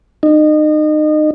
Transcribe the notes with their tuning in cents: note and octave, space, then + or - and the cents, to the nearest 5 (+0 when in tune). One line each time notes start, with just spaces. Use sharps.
D#4 -30